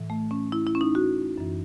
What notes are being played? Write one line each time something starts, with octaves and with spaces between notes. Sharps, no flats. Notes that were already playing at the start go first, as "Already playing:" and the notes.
Already playing: A2 E3
A3
C#4
E4
E4
C#4
D#4
F#4
F#2 E3